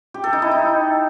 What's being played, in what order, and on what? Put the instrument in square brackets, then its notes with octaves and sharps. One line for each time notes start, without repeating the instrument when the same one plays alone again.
[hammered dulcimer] G4
A4
D#4
E4
D#4